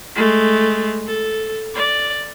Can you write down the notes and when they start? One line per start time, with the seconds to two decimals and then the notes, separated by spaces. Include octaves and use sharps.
0.15 G#3 A3
1.07 A4
1.75 D5